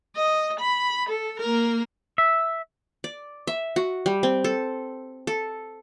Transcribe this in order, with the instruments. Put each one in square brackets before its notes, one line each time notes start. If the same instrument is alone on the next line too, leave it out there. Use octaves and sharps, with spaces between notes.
[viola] D#5
B5
A4
A#3 A#4
[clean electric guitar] E5
[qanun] D5
E5
F#4
G3
C4
A4
A4